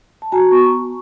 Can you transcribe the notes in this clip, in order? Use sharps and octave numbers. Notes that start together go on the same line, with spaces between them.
A5
F#4 G#5 A#5
B3 C#6